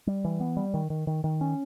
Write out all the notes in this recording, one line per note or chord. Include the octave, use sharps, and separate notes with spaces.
G3
E3
B3
G3
D#3
D#3
D#3
D#3
C#4